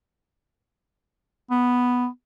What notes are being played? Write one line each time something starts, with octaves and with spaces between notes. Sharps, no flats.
B3